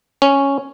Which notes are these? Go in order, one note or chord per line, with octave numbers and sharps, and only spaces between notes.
C#4